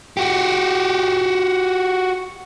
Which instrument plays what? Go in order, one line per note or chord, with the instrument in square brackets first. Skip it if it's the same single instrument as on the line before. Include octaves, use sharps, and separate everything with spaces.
[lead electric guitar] F#4 G4